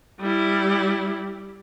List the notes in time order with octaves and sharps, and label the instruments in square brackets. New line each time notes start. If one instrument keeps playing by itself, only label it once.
[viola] G3 E4